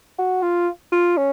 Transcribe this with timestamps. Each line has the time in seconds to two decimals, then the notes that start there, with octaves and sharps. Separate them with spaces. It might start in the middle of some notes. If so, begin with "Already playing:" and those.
0.19 F#4
0.42 F4
0.92 F4
1.17 C#4